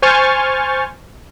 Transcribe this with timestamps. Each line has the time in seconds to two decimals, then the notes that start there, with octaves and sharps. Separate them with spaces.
0.02 C5 G#5 C#6 F6 G6 A6